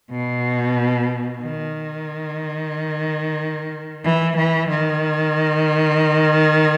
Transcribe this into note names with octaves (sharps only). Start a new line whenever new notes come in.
B2
D#3
E3
E3
D#3